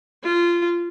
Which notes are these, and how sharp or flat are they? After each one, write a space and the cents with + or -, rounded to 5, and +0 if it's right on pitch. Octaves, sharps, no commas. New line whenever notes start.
F4 -20